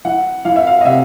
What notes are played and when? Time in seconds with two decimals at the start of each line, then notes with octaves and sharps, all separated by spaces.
0.05 E3 F#5
0.45 E3 F5
0.56 E5
0.67 F5
0.81 D#5
0.85 C3 E5